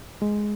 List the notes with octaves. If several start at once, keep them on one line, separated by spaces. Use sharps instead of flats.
G#3